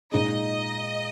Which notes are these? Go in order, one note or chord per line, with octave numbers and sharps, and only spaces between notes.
A#2 G#3 D#4 G#4 D#5